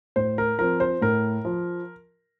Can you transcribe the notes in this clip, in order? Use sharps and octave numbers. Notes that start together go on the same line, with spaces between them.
A2 C5
A#4
F3 C4 A#4
C5
A2 A#4
F3